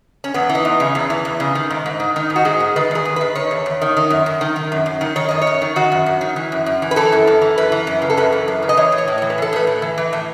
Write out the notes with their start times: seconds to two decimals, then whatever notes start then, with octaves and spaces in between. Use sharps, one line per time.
0.24 C#4
0.34 E2 B3
0.49 E3
0.55 D#4
0.65 E2
0.80 C#3
0.95 E2
1.10 E3
1.25 E2
1.40 C#3
1.55 D#3
1.71 G#2
1.86 G#2
2.00 D#3
2.16 D#3 D#4
2.30 G#2
2.36 F#4
2.45 G#2 G#4
2.60 D#3
2.76 D#3 B4
2.91 E2 G#4
3.05 E2
3.16 D#3 B4
3.35 D#3 C#5
3.51 E2
3.66 E2
3.81 D#3
3.97 D#3
4.10 F#2
4.26 F#2
4.41 D#3
4.56 D#3
4.72 F#2
4.86 F#2
5.01 D#3
5.16 D#3 C#5
5.29 F#2 D#5
5.41 C#5
5.47 F#2
5.62 D#3
5.76 D#3 F#4
5.92 F#2
6.06 F#2
6.21 D#3
6.36 E3
6.52 F#2
6.66 F#2
6.82 E3
6.91 B4
6.96 E3 A4
7.12 F#2
7.27 F#2
7.42 E3
7.58 F#2 B4
7.72 E3
7.87 F#2
8.02 C#3
8.10 A4
8.17 F#2 B4
8.32 E3
8.48 F#2
8.63 C#3
8.69 D#5
8.77 E3 C#5
8.92 A2
8.98 C#5
9.08 A2
9.18 E3 C#5
9.30 B4
9.38 E3 A4
9.53 A2 B4
9.67 A2
9.82 E3
9.98 E3
10.13 A2